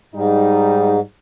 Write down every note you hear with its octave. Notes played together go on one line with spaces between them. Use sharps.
G#2 G3 D#4